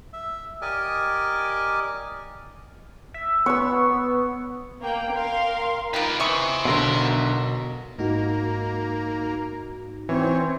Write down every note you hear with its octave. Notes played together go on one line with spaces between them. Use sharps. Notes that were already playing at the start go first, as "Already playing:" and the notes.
E5
G4 A#4 D5 D#5 G#5
E5
B3 C#5 E6
A#3 G5
A#4 F5 C6
D#3 A#3 F4 B4
E3 C5 D#5 E5 C#6
B1 B2 D3 A#4 C6
G#2 A#3 D#4 F#4
E3 C4 C#4